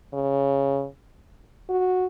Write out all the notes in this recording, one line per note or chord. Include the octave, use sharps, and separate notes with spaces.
C#3
F#4